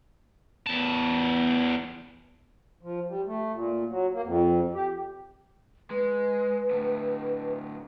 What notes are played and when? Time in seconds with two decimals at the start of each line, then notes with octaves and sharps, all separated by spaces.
0.67 E2 A5
2.83 F3
3.08 G3
3.27 A3
3.54 A#2
3.89 F#3
4.12 A#3
4.24 F2
4.75 G4
5.90 G#3 B4
6.71 A2 D3